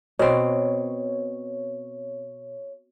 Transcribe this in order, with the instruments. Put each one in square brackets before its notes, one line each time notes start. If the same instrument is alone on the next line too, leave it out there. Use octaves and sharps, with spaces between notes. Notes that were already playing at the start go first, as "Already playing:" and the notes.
[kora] B2 C4 [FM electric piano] C#5